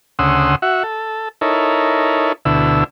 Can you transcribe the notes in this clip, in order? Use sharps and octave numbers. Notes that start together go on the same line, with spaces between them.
D2 C#3 F#5 C6 D#6 E6
F#4 E5 F#5
A4
D#4 E4 A4 A#4 C#5
D2 B2 D3 E4 E6